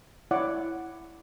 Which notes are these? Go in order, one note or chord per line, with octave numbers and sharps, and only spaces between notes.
E4 C#5 D5 F#5 D6